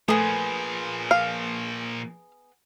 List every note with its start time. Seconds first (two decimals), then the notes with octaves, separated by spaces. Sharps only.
0.08 A#2 F3 A3 B3 G#4
1.11 F5